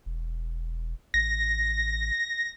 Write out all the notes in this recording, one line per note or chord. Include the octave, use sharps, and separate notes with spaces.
E1
A1 A#6